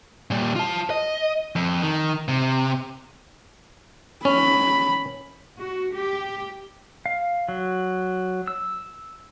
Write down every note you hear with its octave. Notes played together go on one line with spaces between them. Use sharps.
A#2 G3
F4 A5
D#5
F2
D#3
C3
C#4 B5
F#4
G4
F5
F#3
E6